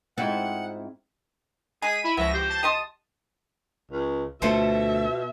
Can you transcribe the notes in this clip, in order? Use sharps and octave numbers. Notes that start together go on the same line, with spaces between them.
G#2 C4 E4 F4 F#5
G#3 G#4 G#5 B6 D#7
E4 B5
C#2 F3 B3 C#5 E5 A#6
G4 C5
A5
G4 D#5 C6 D#6
C#2
D2 B2 A3 F4 A4 C5 E5